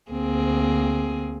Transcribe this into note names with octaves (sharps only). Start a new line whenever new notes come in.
D2 A#3 C4 G#4